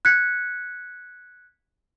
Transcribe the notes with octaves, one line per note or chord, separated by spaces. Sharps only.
F#6 G#6 B6 C#7